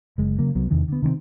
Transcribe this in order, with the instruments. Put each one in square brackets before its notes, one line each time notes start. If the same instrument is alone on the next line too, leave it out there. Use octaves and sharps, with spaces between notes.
[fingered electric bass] F#1 G#3
C#3 F#3 A#3
C2 F#3 B3
E2 C3 D#3 E3
D3 B3
C3 D#3 A#3 C4